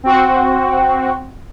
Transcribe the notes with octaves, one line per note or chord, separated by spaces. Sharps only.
C4 F#4